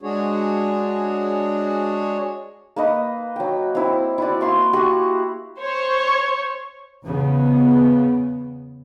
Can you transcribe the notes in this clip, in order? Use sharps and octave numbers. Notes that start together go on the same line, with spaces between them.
G#3 D4 F#4 G#4 C#5
A#3 B4 D#5
F#3 G5
C4 E4
E4 F#4 D5
A#3 C6 C#6
F#4 G4 F#5
C5 C#5
E2 C#3 B3